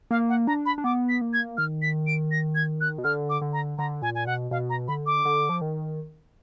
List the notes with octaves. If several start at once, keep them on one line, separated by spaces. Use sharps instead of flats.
A#3 F5
F#5
D4 A#5
B5
D4
B3 D6
B6
A#3
G#6
D#3 F6
B6
D7
A#6
G#6
F#6
B2
D3 F6
D6
D3
A#5
D3 A#5
A#2 G#5
G#5
B2 F#5
B2 F5
A#5
D3 B5
D6
D3
F3
D#3